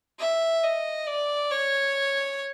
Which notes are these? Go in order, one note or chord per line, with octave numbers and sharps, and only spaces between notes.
E5
D#5
D5
C#5